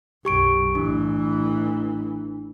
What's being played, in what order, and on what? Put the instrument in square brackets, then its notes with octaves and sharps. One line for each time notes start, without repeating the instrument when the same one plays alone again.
[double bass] B1 F#2 [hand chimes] G4 C#6 D7
[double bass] A1 E3 [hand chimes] D4